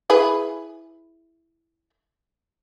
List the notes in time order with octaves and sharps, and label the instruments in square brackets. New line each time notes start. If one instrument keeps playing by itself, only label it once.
[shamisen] E4 G#4 B4